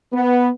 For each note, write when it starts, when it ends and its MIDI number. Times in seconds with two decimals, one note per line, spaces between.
0.13 0.49 59